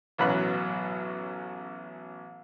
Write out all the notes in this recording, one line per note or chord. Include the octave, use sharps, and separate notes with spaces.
A1 F#2 B2 F#3 B5 F#6